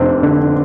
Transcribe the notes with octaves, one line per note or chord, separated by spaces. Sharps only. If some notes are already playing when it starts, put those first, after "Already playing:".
Already playing: F1 F2 C4 D4
D3